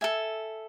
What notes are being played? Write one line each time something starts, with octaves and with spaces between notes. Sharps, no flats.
A4 E5 G#5